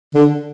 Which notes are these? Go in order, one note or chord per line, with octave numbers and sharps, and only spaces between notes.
D3